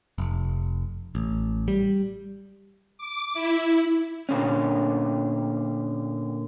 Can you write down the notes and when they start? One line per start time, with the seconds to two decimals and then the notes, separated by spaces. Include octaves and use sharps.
0.18 F1
1.15 A1
1.68 G3
2.98 D6
3.34 E4
4.29 A#2 D3 C#4